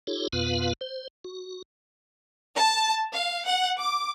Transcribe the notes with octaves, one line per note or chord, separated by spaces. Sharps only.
D#4 F4 G4 A4 C#5
F2 B2 B3 F4 B4 F5
C5
F#4
A5
F5
F#5
D6